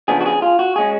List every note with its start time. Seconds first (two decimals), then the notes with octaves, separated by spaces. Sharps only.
0.08 C#3 F3 B3 D4 G#4
0.20 F#4
0.26 G#4
0.42 F4
0.59 F#4
0.76 G#3 C#4 G#4